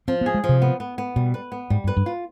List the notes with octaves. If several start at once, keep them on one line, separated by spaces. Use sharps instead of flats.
F3 C4
B3
G#4
G#3
F3
C3
B3
B3
B3
B2 G3
B4
B3
G#2 G3
G2
B4
G2
F4